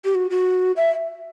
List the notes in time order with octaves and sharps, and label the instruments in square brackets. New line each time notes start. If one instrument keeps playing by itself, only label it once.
[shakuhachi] G4
F#4
F#4
E5